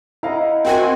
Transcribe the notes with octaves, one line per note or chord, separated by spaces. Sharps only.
E4 D#5 F5 F#5 A#5
C4 F#4 A#4 G5 G#5 C6